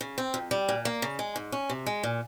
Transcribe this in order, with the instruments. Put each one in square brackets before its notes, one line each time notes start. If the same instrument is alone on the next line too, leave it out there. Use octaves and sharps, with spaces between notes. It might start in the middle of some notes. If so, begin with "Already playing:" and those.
[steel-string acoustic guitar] C#3
C4
F2
G3
A#2
A#3
C#3
G#3
G#2
C#4
C3
G#3
A#2